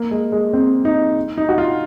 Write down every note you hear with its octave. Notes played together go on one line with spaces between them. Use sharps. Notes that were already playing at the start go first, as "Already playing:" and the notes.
Already playing: A#3
G#3
G#3
C4
D#4
D#4
F#4
F4